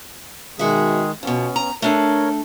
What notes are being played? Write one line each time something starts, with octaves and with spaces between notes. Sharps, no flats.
B2 D#3 G#3 F#4 G#4 E5
F2 B2 B3 C#4
A#5
A3 D4 A4 A#4 C#5